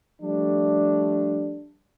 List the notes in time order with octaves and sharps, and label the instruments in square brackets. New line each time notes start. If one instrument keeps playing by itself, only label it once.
[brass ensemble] F3 G3 A3 D4